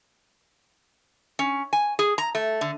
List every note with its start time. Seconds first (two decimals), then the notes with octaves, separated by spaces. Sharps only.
1.39 C#4
1.73 G#5
1.99 G#4
2.18 A#5
2.35 A3
2.61 D3